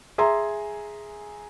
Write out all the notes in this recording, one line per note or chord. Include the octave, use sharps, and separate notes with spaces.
G#4 E5 G#5 A#5 C6